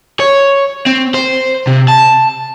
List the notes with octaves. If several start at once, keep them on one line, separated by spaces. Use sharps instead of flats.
C#5
C4
C5
C3
A5